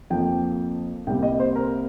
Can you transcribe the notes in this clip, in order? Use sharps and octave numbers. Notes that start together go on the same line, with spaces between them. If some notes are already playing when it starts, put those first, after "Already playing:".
F2 F3 A#3 G5
C2 C3 G3 A#3 G5
D#5
C5
A#4